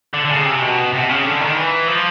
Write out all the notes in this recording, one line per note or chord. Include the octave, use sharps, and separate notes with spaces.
D3
D3
C#3
C3
B2
C3
C#3
D3
D#3
E3
F3